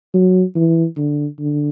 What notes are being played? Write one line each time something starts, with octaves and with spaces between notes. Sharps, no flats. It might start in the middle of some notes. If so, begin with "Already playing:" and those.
F#3
E3
D3
D3